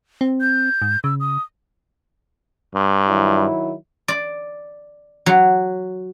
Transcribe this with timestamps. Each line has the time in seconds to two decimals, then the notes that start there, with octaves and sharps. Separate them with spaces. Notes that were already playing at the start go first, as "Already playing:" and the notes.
0.21 C4
0.41 G6
0.82 G#2
1.04 C#3 E6
1.20 D#6
2.75 G2
3.08 D#3 F#3 E4
4.08 D5
5.26 F#3